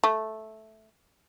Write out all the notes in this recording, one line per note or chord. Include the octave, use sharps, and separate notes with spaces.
A3